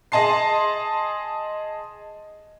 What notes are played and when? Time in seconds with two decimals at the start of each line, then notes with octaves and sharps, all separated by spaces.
0.12 G#4 D#5 A5 C6 C7